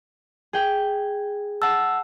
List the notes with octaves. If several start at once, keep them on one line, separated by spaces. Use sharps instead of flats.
G#4 G5
F#5 A5 E6